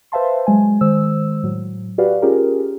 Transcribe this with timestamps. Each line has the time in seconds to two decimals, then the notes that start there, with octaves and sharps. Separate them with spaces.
0.12 B4 C5 E5 F5 A5 C6
0.47 F#3 G#3 G#5
0.81 D#3 G#3 C5 E6
1.43 A2 F#3
1.98 F#4 G4 B4 D5 F5
2.22 C#4 F4 G4 G#4 A#4